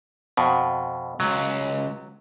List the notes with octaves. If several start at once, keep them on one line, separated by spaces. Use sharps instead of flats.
F2 B2
C#2 F#3